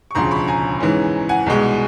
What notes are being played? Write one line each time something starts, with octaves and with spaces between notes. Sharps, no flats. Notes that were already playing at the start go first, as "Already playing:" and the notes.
C#6
E1 D2 C#3 F3 A#5 C6
B5 C#6
G#5 A#5
G#2 E3 G#3 C#4
F#5 G#5
C2 B2 G#3